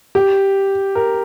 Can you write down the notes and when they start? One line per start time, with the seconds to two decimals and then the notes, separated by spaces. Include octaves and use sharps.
0.15 G4
0.95 A#4